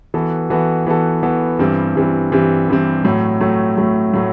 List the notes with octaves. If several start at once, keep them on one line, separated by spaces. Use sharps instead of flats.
E3 B3 F#4 A4
E3 B3 F#4 A4
E3 B3 F#4 A4
E3 B3 F#4 A4
G2 E3 G3 C4
G2 E3 G3 C4
G2 E3 G3 C4
G2 E3 G3 C4
A2 F#3 A3
A2 F#3 A3
A2 F#3 A3
A2 F#3 A3